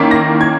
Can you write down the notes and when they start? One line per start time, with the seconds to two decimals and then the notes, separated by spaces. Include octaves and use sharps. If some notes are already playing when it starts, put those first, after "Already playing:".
Already playing: D#3 A#3 C#4 E4 B6
0.11 A#6
0.41 G#6